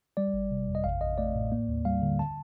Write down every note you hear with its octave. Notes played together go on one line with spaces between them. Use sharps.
G3 D5
G1
C3
F2
D#5
A1 F5
A1 D#5
A3 D5
A2
A#3
D#2
G3 F5
D3
A5